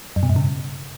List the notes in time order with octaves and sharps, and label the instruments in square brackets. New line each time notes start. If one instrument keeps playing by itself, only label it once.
[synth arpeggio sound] F#2
B2
G2
C#3